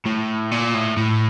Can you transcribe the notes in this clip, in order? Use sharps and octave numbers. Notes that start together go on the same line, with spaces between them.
A2
A#2
A2
A2